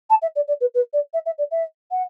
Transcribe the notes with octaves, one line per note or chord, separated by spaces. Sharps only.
A5
E5
D5
D5
B4
B4
D5
E5
E5
D5
E5
F#5